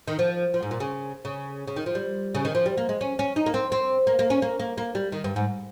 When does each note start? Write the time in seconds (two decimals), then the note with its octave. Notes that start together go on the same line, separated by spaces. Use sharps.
0.08 D#3
0.19 F3
0.54 F3
0.63 G#2
0.71 A#2
0.80 C#3
1.25 C#3
1.68 C#3
1.76 D#3
1.86 F3
1.95 G3
2.35 C#3
2.45 D#3
2.55 F3
2.66 G3
2.78 A#3
2.89 G#3
3.01 C#4
3.19 C#4
3.36 D#4
3.46 A#3
3.54 C4
3.72 C4
4.07 A#3
4.19 A#3
4.30 C#4
4.42 A#3
4.60 A#3
4.78 A#3
4.95 G3
5.12 D#3
5.24 G2
5.36 G#2